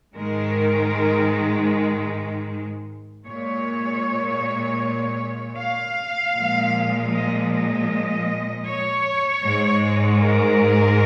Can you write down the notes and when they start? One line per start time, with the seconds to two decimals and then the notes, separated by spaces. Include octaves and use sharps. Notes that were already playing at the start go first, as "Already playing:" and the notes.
0.16 G#2 D#3 G#3 A#4
3.25 A#2 G#3 C#5
5.57 F5
6.35 A#2 F3 G#3
7.12 D#5
7.51 D#5
8.67 C#5
9.44 G#2 G#3
10.21 A#4